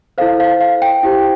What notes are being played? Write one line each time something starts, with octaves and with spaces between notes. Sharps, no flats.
E4 A4 C5 F5
F5
F5
G5
E4 G4 C5